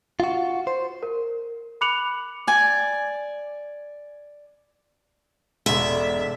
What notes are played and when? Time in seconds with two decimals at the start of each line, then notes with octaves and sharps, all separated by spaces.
0.20 F4 F#4
0.67 C5
1.03 A#4
1.81 B5 D6 F#6 C#7 F7 F#7
2.47 D5 G#5
5.66 E1 G#2 D3 G#3 E5 C#6